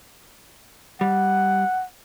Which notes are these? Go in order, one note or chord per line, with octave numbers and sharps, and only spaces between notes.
G3 F#5